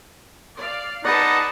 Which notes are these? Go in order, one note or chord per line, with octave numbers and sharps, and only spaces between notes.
D5 F5
D#4 G#4 B4 D5 F#5 A5 B5